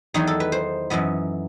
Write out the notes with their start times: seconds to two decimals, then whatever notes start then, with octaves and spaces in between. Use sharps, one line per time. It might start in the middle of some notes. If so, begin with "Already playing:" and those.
0.14 E2 D#3 F#3 B3 D#4
0.27 A4
0.40 B4
0.52 C5
0.90 F#2 E3 B3 D#5